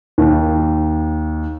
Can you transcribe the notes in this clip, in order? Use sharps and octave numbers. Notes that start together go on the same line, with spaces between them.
D#2